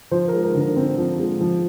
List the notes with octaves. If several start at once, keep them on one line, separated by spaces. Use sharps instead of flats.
F3 C5
A#4
G#3
A#4
D3
A#4
C4
F3
G#3
F3